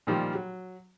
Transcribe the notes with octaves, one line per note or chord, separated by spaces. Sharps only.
A#2 D#3 F3 G3
F#3